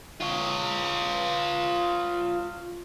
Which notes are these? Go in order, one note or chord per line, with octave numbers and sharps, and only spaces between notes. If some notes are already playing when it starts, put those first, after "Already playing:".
F4 C#5